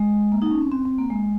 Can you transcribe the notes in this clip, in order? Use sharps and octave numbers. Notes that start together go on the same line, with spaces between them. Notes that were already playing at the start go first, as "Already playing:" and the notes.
Already playing: G#3
A#3
D#4
C#4
C4
C4
C4
A#3
G#3